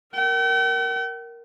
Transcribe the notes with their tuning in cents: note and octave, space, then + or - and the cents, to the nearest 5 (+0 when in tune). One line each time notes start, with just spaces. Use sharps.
A#4 +0 G5 -45